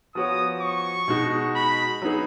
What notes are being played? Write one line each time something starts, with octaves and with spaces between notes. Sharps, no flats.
F3 B3 F#4 C#5 D#6
C#6
B2 G#3 D#4 F#4
B5
F#3 B3 D#4 G#4